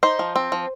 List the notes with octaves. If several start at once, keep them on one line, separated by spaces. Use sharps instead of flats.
D#4 C5
F3
C4
F3